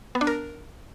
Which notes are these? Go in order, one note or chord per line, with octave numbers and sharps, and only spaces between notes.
B3
D4
A#4